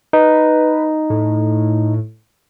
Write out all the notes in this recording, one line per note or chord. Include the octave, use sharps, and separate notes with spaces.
D#4 B4
A2